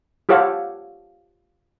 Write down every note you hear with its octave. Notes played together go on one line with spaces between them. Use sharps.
F4 G4 A4 C#5 F5 F#5